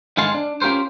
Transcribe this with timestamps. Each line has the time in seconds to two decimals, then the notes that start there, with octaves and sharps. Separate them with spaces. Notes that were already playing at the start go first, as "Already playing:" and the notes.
0.17 G#2 D#3 G#4 F5 A5 C6
0.34 D4
0.62 C#4 F4 G4 A#4 C5